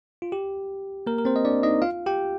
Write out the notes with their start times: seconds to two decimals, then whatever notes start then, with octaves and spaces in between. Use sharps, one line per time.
0.22 F4
0.32 G4
1.07 A#3 A#4
1.18 A#4
1.25 C4 C5
1.36 D#5
1.45 D4 D5
1.63 D#4 D#5
1.82 F4 F5
2.06 G4 G5